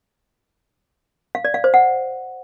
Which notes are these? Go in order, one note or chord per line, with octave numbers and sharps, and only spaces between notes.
F5
D5
F5
C5
F#5